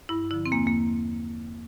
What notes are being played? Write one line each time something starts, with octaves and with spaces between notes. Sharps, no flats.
G2 E4
D3 F3 E4
C4
E2 A#3
A#3